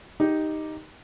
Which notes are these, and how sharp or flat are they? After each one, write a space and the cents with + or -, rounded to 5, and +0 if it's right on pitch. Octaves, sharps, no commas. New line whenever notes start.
D#4 +0 G4 +0